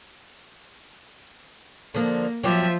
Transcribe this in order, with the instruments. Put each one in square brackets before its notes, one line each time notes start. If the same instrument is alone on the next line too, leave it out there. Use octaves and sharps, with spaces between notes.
[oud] D3 F3 [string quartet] A#3
[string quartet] F3 E5 [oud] F#3 C4 G4